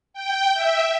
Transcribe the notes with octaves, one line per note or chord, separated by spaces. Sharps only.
G5
E5